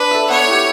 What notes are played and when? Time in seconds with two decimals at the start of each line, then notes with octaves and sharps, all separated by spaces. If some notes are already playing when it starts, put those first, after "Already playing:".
Already playing: D4 B4
0.11 A4 E5
0.29 B3 C#5
0.47 E4 G4